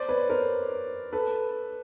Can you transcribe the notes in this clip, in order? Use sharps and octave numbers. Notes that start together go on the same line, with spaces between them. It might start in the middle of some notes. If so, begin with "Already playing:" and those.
Already playing: C5 D5
B4 C#5
A#4 C5
A4 B4